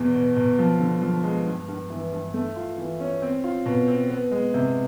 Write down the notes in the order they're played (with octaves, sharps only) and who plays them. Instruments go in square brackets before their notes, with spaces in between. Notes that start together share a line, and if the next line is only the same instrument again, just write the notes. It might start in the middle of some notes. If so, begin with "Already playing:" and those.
Already playing: [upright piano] E2 B2
B2
B2
F3
D3
F3
G#3
G2
G2
E3
G2
A3
F4
E3
C#4
C4
F4
B2
C4
B3
G#3
C3